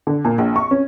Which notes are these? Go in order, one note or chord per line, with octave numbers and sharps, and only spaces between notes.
D3
A#2
A#1
C#6
C#4